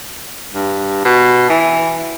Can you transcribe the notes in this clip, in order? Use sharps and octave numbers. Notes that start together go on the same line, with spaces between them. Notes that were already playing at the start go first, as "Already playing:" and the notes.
G2
B2
E3